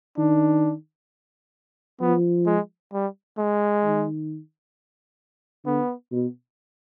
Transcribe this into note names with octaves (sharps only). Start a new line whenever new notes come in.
D#3 D4
F3 B3
G#3
G3
G#3
D#3
D3 B3
B2